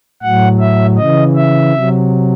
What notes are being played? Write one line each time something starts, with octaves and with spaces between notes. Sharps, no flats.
A2 F#3 F#5
E5
C#3 E3 D#5
E5
C3 F#3